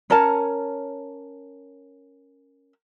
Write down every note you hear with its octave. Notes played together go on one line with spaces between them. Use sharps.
C#4 A#4 C#5 A5